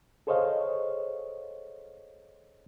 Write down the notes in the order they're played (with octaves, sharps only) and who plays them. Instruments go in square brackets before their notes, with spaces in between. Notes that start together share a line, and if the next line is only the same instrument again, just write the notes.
[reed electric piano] G#4 A4 C5 C#5 D#5 F5